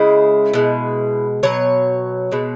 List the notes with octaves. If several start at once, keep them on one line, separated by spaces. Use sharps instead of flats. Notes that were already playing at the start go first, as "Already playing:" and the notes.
Already playing: C#3 G#3 E4
B2 G#3
B2 F#3 C#5
B2 G#3